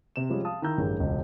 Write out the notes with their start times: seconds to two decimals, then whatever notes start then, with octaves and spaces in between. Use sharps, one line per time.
0.16 C3 E7
0.29 F3 G3 G#3 C#4 G#4
0.45 F5 A5 D#6
0.62 D#3 E4 A#5 E6 G6
0.78 A1 G2 G#4 A#4
1.00 E1 C#2 D#5